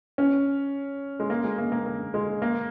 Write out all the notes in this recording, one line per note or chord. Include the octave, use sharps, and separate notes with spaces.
C#4
G#3
A#3
G#3
A#3
A#3
A#3
G#3
A#3